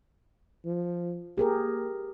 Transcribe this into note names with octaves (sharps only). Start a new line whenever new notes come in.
F3
A#3 G4 G#4 A#4